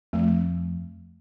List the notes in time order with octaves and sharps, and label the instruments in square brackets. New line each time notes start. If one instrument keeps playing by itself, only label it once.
[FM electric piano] F2 [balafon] A3